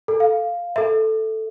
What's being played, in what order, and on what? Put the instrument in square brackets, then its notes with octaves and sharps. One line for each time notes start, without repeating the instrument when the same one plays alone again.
[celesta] A4
F5
A4 E5